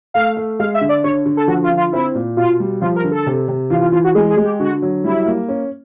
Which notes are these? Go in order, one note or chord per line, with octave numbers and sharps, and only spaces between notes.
A3 F5
A3
G#3 F5
E5
D3
D5
D3 C#5
D3
A4
F3 F#4
F4
D3
F4
C4 E4
A#2
B2 F4
G3
F3 F4
A#4
D3
A4
C3
C3
E3 F4
F4
E3 F4
F#4
G#3 G#4
G#4
G#3
G4
D3 F#4
F#3
G3 E4
A#3
C#4